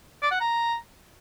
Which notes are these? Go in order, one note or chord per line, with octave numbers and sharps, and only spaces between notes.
D5
F#5
A#5